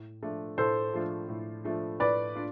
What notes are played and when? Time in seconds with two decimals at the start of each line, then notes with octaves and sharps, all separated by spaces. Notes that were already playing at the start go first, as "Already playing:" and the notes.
Already playing: A2
0.22 F3 A3 D4 F4
0.58 A2 A4 C5
0.94 F3 A3 D4 F4
1.29 A2
1.64 F3 A3 D4 F4
2.00 A2 B4 D5
2.35 D4 F4